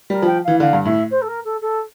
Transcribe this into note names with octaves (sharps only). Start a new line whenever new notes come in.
G3 A#4
F3 G5
E3 F5
D3 F5
G2
A2 E5
C5
A4
A#4
A4
A4